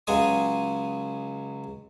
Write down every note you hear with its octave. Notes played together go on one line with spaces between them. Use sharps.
C#2 C#3 F#3 G#3 G#5 D#6